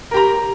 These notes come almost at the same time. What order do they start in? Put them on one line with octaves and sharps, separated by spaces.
A#4 G4 A#5